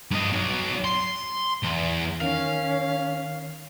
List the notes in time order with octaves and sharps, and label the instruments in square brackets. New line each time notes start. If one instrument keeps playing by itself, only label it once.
[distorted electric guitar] G2 D#5
B1 F#3
C6
E2
[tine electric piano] D#3 [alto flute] C#4 [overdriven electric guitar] F5